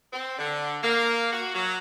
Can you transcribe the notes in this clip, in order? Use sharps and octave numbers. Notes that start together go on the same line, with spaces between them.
C4
D3
A#3
F#4
F#3